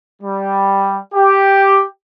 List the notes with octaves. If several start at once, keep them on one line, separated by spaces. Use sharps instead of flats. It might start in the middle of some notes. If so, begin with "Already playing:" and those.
G3
G4